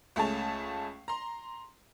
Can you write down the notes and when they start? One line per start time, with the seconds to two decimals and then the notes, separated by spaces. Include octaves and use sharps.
0.16 C#2 A3 C#4 G#4 A5 F7
1.08 A#5 C6